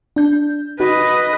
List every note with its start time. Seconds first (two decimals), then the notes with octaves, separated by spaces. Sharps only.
0.16 D4 G6
0.80 D#4 F#4 B4 D#5